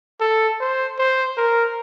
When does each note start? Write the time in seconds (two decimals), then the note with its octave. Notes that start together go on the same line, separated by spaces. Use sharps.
0.21 A4
0.60 C5
0.99 C5
1.37 A#4